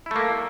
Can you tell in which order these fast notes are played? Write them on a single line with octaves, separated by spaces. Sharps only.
E4 A3 A#3